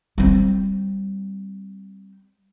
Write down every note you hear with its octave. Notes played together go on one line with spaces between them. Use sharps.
G3 C4